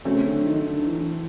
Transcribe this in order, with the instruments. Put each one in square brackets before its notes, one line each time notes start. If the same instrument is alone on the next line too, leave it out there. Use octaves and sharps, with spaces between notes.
[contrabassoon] C#3 [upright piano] F#3 A3 C4
[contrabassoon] D3
D#3
D3
E3